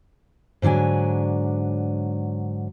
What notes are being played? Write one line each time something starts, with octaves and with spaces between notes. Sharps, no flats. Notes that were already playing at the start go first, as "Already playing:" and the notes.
G#2 D3 F#3 D4 G#5